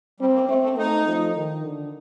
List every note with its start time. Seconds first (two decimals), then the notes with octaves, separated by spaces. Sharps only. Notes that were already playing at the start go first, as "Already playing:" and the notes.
0.20 G3 C4
0.34 A#3
0.49 A3 C4
0.64 A3
0.78 A3 D#4
1.06 F3
1.36 D#3
1.64 D3